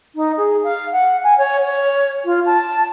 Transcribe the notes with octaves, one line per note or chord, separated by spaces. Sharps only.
D#4
G#4
F5
F#5
G#5
C#5
C#5
F4
A5